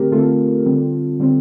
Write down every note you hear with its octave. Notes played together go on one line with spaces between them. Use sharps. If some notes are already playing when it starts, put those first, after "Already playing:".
Already playing: D3 A3 C4 G4 A#4
D3 A3 C4 F4 A4
D3 G3 C4
D3 G3 C4